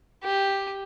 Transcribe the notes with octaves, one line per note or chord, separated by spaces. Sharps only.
G4